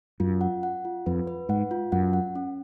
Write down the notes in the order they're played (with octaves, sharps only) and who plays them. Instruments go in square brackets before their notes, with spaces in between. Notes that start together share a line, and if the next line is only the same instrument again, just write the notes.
[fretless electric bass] F#2 [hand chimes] F4
[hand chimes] F#5
F#5
F4
[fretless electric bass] F2 [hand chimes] B4
[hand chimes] B4
[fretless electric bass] G#2 [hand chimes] F#5
[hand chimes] F4
[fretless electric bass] F#2 [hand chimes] F#5
[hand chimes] F#5
C#4